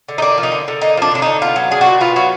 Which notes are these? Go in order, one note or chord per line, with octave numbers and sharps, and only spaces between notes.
D3
D#4
A#3 D4
F3
D#4
D3
D3
A#3 D#4
F3 D4
D3 D4
D3 D#4
B3 F4
F#3
D4 G#4
F#4
A#2
B3 F4
F#3 F#4